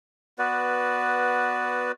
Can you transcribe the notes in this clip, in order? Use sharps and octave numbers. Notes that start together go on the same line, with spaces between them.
B3 F#4 B4 D5